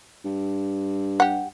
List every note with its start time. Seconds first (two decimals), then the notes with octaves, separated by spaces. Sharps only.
0.25 G2
1.20 G4 F#5